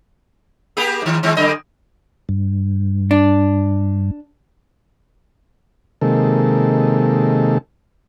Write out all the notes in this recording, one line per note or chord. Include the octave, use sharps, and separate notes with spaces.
A#3 G4 G#4
G#2 D#3
D#3 G#3 C4
F#2 D3 D#5
G2
D4
C3 D#3 G#3 A#3 A4